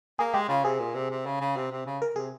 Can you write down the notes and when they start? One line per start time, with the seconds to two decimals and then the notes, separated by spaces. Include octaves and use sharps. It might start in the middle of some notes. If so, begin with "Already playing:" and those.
0.19 A#3 G#4
0.34 G#3 G4
0.49 C#3 F4
0.64 C3 G#4
0.79 A#2
0.94 C3
1.11 C3
1.26 C#3
1.41 C#3
1.56 C3
1.71 C3
1.86 C#3
2.02 A#4
2.16 C3 G#4